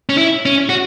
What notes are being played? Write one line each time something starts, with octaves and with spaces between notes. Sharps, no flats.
C#4
E4
C#4
F#4